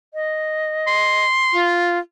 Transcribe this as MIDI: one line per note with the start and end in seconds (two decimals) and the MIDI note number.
0.14 1.25 75
0.87 1.70 84
1.53 1.98 65